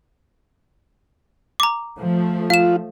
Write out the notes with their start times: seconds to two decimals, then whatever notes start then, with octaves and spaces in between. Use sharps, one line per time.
1.60 A#5 D6
1.99 F3 A3
2.50 F4 F5 E7